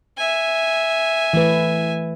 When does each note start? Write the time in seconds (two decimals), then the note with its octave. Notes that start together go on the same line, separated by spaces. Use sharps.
0.17 E5 G#5
1.33 E3 A3 B4